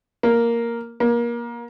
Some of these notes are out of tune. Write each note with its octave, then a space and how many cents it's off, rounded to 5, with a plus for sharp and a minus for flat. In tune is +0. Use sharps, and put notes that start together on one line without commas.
A#3 +0
A#3 +25